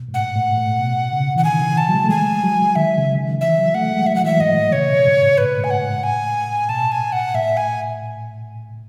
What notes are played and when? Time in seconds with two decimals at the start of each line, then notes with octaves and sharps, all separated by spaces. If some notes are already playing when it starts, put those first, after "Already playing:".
Already playing: B2
0.08 G#2
0.14 A2 F#5
0.36 A2
0.58 A2
0.79 B2
1.12 C#3
1.36 E3 F#5
1.44 D#3 G#5
1.61 E3
1.77 A5
1.89 F#3
1.94 G#3
2.04 A3
2.10 G#3 G#5
2.43 F#3
2.76 D#3 E5
2.98 C#3
3.19 D#3
3.41 E3 E5
3.58 F#3
3.75 A3 F#5
3.91 G#3
4.07 F#3 E5
4.16 F#5
4.24 E3 E5
4.40 G#2 D#5
4.56 A2
4.72 C#3 C#5
4.89 B2
5.05 G#2
5.22 A2
5.38 A2 B4
5.60 G#2 G#5
5.70 F#5
5.82 G#2
6.03 A2 G#5
6.69 B2 A5
6.92 G#5
7.12 F#5
7.34 A2 E5
7.57 G#5